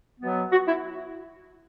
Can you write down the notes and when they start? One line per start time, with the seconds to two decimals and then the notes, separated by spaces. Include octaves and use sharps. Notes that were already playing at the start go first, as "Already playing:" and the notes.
0.21 B2 F#3 B3
0.52 F#4
0.68 E4